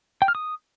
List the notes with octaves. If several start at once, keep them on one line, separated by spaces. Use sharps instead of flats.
G5
F6
D#6